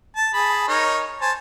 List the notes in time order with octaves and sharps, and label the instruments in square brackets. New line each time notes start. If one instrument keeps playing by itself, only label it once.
[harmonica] A5
G#4 A5 B5
D#4 A#4 C#5
C5 G#5 A5